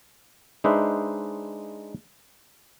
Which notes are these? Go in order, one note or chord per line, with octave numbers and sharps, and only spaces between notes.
G#3 D4 D#4 B4 C5 E5